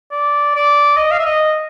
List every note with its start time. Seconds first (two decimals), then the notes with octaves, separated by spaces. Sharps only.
0.12 D5
0.55 D5
0.97 D#5
1.11 F5
1.19 E5
1.26 D#5